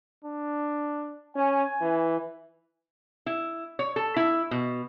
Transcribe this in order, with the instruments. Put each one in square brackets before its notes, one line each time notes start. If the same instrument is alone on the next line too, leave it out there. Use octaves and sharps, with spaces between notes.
[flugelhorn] D4
[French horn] C#4 [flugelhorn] G#5
[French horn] E3
[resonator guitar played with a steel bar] E4
C#5
A4
E4
B2